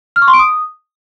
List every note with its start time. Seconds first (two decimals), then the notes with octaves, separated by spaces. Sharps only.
0.16 F6
0.22 C#6
0.28 C6
0.33 D7
0.39 D#6